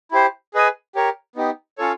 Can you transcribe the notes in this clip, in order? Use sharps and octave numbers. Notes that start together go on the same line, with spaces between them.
E4 G4 C5
G#4 B4 D#5 G#5
G4 A#4 C#5
B3 D#4 G4
C#4 F4 A4 C#5